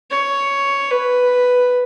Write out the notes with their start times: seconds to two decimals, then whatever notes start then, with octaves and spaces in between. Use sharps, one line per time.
0.11 C#5
0.90 B4